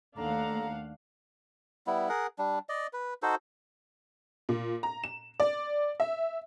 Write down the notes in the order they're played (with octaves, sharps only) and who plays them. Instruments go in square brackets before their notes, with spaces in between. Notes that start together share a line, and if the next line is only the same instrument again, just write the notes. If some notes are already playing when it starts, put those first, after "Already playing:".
[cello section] D#2 A3 [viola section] D4 F5 F#5 [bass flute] A4 [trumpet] A#5
[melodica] G3 B3 E4
G#4 A#4 F#5
G3 D4
D5 D#5
B4
D#4 F#4 A4 C5
[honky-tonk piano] A#2
A#5
E7
D5
E5